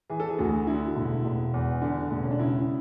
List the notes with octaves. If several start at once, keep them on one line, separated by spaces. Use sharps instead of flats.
E3 G#4
A4
G#4
D2 F#4
D3 E4
E1
E1
E2
D3
E1
C#4
D4
C#3 E4